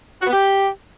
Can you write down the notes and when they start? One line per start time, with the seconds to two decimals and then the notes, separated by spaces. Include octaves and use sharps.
0.20 F#4
0.26 B3
0.32 G4